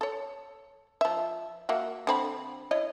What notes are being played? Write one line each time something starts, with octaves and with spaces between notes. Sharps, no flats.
A4 C#5
F3 E5
A#3 F#4 E5
D3 C4 B5
E4 C#5 D#5